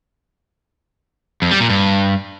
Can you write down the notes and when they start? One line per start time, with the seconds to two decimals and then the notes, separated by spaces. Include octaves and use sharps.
1.42 F2
1.51 G3
1.60 A#2
1.70 G2